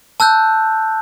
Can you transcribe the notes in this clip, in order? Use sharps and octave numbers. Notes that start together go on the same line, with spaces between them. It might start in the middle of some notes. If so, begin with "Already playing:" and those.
A5 E6 F#6 G6